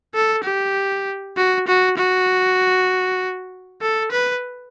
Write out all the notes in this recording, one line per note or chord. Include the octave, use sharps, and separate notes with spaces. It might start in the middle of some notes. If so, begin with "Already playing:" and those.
A4
G4
F#4
F#4
F#4
A4
B4